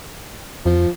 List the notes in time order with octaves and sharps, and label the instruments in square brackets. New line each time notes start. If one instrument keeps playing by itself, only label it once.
[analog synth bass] F2 [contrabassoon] F3